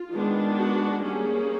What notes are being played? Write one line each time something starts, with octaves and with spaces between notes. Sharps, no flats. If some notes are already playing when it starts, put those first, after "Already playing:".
Already playing: F4
D#3 G#3 B3 D4
F#4
G3 A#3 C#4 G#4